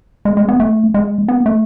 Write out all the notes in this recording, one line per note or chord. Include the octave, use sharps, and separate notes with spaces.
G#3
G#3
B3
A3
G#3
B3
A3